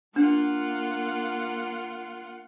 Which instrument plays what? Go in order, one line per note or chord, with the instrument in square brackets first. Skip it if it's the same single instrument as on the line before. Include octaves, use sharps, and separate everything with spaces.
[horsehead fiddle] A#3 [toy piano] D4 [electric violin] F4 F#5